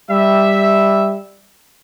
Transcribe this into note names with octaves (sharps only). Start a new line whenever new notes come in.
G3 E5